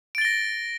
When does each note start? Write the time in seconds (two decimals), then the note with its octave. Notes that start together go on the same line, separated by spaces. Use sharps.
0.15 D7
0.18 A6
0.21 G7
0.25 A#6